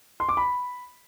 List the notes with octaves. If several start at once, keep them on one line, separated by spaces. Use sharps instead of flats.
C6
D6
B5